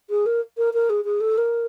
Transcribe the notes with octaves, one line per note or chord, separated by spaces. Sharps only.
G#4
A#4
A#4
A#4
G#4
G#4
A4
A#4